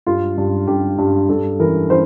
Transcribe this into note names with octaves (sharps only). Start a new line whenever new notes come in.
G2 F4
G2
G2 G4
G2
G2 A4
E3 A#4
E3 C5